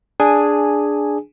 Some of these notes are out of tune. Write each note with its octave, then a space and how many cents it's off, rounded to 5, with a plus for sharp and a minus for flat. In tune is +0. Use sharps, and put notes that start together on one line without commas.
D4 +0 G#4 +0 G#5 -5